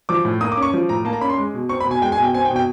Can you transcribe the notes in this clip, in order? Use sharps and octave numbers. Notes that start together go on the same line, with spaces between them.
F3 D6
A2
A#3 D#6
D6
C#4
C#6
F3
A2 A#5
A#3 A5
A#5
C#4 B5
C6
G#3
B2
C4 C#6
B5
B2
G#5
G#3 G5
G#5
B2
G5
C4 G#5
G5
B2
G5